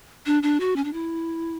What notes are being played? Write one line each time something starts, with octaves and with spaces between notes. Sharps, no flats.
D4
D4
F#4
C#4
D4
E4